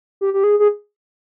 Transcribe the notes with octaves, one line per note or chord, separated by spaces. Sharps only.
G4
G4
G#4
G#4